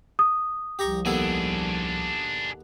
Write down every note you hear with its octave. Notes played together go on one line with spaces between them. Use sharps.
D#6
C2 F3 G4 A#5 C#6
D#2 B3 D4 G#4 A4